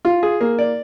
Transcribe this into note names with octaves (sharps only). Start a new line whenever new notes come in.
F4
G#4
A#3
D5